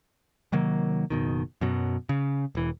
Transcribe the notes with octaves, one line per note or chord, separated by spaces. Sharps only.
C3 D#3 F#3 A#3
F#1 B2 D#3
F#2 B2 F#3
C#3
E1 E3